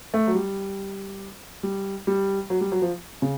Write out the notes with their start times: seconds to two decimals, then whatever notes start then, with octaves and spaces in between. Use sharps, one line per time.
0.14 A3
0.27 F#3
0.35 G3
1.63 G3
2.07 G3
2.50 F#3
2.61 G3
2.72 F#3
2.82 F3
3.22 C#3